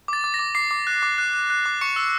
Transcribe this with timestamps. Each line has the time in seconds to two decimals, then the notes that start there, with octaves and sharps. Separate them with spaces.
0.08 D6 A6
0.24 D6
0.34 A#6
0.39 D6
0.55 D6 C7
0.71 D6
0.87 F#6
1.03 D6
1.18 F#6
1.34 F#6
1.50 F#6
1.66 D6
1.81 C#6 C#7
1.96 E6